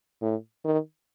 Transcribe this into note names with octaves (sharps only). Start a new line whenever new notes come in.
A2
D#3